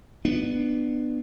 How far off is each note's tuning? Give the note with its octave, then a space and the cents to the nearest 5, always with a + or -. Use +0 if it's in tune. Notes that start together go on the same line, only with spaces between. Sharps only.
B3 +0 D4 +30